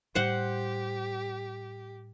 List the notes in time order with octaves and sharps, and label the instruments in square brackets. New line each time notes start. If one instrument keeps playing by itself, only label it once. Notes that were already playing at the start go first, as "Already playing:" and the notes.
[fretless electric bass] A2 G3 [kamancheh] G4 [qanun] C5 F#5